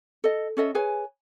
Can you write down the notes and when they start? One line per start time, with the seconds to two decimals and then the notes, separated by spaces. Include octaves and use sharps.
0.24 A4 D#5
0.57 C#4 A4 D#5 E5
0.75 G#4 B4 C#5 G#5